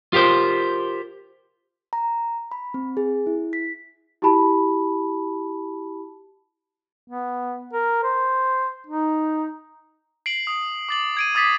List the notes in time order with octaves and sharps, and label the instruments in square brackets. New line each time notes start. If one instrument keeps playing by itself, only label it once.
[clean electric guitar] F4 G4 A#4 C5
[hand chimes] A#5
B5
C4
G#4
E4
B6
[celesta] E4 F#4 G4 A5 B5
[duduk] B3
A#4
C5
D#4
[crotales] C7 D7 F#7
D#6
D6 A6 F#7
G#6 D7 D#7
D6 D#6 A6 B6 C7